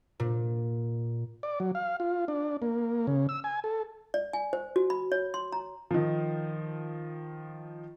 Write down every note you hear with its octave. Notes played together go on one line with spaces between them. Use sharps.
A#2
D5
F#3
F5
F4
D4
A#3
C#3
E6
G#5
A4
D5
G#5
C5
F#4
B5
C#5
C6
A#5
D#3 F3